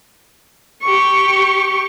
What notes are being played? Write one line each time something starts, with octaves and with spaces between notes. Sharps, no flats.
G4 C#6